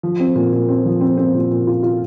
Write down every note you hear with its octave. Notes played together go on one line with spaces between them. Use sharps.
F3
C4
A#2
A#2
C4
F3
C4
C4
A#2
A#2
F4
F4